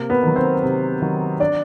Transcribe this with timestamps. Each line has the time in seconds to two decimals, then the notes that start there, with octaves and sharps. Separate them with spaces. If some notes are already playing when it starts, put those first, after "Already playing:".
Already playing: C3 A#3 A#4
0.10 B3 B4
0.23 D#3 F#3
0.36 C4 C5
0.63 C3
1.02 D#3 F#3
1.40 D4 D5